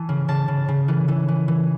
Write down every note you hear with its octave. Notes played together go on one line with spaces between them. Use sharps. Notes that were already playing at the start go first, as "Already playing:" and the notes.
Already playing: E3 A5
C#3
C#3 A5
C#3
C#3
E3
E3
E3
E3